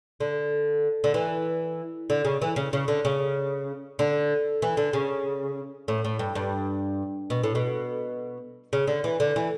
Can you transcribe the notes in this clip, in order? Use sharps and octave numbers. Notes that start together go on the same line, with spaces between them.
D3
D3
E3
D3
C#3
E3
C#3
C#3
D3
C#3
D3
E3
D3
C#3
A2
A2
G2
G2
B2
A2
B2
C#3
D3
E3
D3
E3